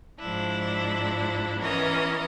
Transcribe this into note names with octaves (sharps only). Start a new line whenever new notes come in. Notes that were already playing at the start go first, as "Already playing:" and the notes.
G#2 F3 D4 E4
E3 B3 C#4 A#4 D#5